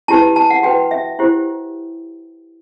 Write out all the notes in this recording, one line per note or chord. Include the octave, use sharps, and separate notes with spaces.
E4 G4 B4 A5
A5
F#5
F#4 B4 G5
E5
E4 G4 C5